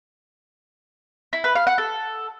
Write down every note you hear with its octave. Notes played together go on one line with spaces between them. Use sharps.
E4
B4
F5
F#5
A4